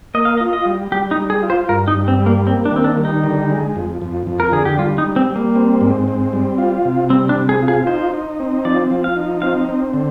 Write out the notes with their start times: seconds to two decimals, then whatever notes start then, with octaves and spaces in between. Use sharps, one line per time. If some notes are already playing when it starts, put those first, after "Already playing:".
0.14 A#3 D#5
0.25 F5
0.37 D#5
0.41 F4
0.53 D#5
0.66 G3
0.92 G3 G4
1.11 D#4
1.17 G3
1.30 G#4
1.43 F4
1.50 C5
1.69 G2 A#4
1.88 D#4
1.95 G2
2.08 C4
2.20 G3
2.26 A#3
2.46 A#3 C4
2.65 D4
2.72 D#3 C4
2.84 D4
2.97 G3
3.05 D#4
3.24 D3
3.50 G#3
3.76 F2
4.01 F2
4.27 F2
4.40 A#4
4.52 D3 G#4
4.65 G4
4.78 G3 F4
4.98 D#4
5.04 G3
5.16 C4
5.30 G3
5.36 A#3
5.56 C4
5.81 G#2
6.08 C4
6.33 G3
6.58 F4
6.85 C3
7.10 G3 C4
7.29 D4
7.35 C3
7.49 G#4
7.62 F4
7.68 G#4
7.87 D#4 C5
8.14 D#4
8.40 C4
8.65 F3 D5
8.91 F3
9.04 F5
9.16 D#4
9.42 C4 F5
9.69 C4
9.93 D3